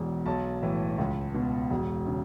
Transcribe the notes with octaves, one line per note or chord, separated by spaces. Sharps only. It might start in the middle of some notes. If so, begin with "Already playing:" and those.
Already playing: E1 E2 B2
B1 A5
A2 E3
C#2
B2
E1
C#3